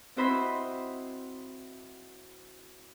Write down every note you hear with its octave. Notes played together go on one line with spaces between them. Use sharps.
C4 E4 F#4 C5 D#5 B5